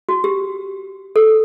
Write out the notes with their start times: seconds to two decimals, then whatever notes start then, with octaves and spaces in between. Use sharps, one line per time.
0.09 F#4
0.24 G4
1.16 A4